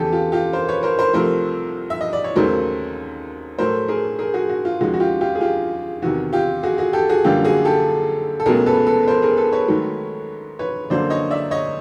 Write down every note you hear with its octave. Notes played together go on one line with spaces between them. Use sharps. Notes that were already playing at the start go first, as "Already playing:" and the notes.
Already playing: E2 C#3 E3 G4 A4
F4 G4
F4 G4
A#4 C5
B4 C#5
A#4 C5
A#4 C5
C2 C3 F3 A3 A#4 C5
E5
D#5
D5
C#5
D#2 C#3 F#3 A3 A#4 C5
A2 F#3 A3 A#4 C5
G#4 A#4
G#4 A#4
F#4 G#4
F#4
F4
D#2 C#3 F3 G#3 F#4
F#4
F4 G4
F4 G4
G#4
F4 G4
E2 C3 D#3 F#4
F4 G4
F#4 G#4
F#4 G#4
G4 A4
F#4 G#4
F#2 D3 G3 A#3 F4 G4
F#4 G#4
G4 A4
A4
C#2 B2 F#3 A3 G#4 A#4
A4 B4
A4 B4
B4
A#4 C5
G#4 A#4
A4 B4
B4 C#5
G#2 D#3 F#3 A3
B4 C#5
F#2 D3 F#3 A#3 C5 D5
C#5 D#5
D5 E5
C#5 D#5